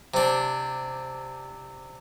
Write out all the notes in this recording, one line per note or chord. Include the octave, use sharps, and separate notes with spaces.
C3 D4